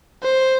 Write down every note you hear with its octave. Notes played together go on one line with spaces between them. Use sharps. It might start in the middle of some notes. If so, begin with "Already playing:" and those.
C5